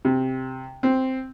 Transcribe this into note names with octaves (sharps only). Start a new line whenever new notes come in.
C3
C4